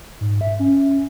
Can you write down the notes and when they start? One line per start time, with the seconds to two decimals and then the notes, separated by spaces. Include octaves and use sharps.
0.21 G#2
0.41 E5
0.59 C#4